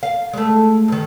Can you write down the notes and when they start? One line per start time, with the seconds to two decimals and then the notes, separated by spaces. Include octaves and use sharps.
0.03 F5
0.33 G#3 A3
0.88 G2 D#3